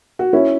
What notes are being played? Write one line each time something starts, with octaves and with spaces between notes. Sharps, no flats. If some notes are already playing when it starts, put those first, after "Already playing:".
F#4
C#4 E4